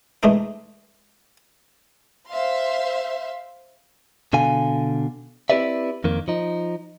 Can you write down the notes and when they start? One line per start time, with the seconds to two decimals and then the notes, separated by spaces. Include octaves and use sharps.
0.23 E3 G#3 A3 D4 D#4
2.30 C5 E5 F5 C6
4.33 B2 D3 F5 G#5
5.50 C4 E4 G4 B4 D5 E5
6.04 F2 D#3 A#3
6.28 F3 D#4